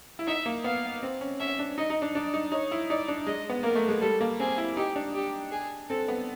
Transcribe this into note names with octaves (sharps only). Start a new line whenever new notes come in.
E4
D#4 E5
A#3
B3 F5
C4
C#4
C#4 E5
D4
D#4 D#5
D#4
D4
D4 D5
D#4
D#4 C#5
E4
D#4 D5
D4
G#3 D#5
B3
A#3 A#4
A3
G#3
G3 A4
A#3
C4 G#4
E4
D#4 G4
D4
G4
G#4
C4 A4
B3